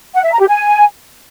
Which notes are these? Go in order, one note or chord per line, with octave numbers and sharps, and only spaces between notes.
F#5
E5
A#5
G4
G#5